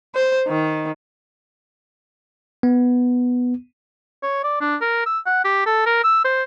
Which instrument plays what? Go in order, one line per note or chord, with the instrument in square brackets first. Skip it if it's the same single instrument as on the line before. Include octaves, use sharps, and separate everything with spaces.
[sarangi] C5
D#3
[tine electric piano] B3
[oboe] C#5
D5
D4
A#4
E6
F#5
G4
A4
A#4
E6
C5